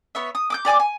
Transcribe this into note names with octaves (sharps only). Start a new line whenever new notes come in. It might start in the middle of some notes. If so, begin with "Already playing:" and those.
B3 C#5 E5
D#6
D6 D#6 G6
G4 D5 G#5 D6
G#5